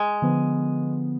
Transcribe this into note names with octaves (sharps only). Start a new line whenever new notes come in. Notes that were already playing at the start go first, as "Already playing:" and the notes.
Already playing: G#3
D3 F3 B3